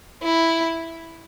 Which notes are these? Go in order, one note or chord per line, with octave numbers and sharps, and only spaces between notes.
E4